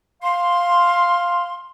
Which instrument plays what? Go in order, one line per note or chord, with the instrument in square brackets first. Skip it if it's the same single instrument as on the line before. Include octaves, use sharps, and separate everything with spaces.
[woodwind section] F5 C6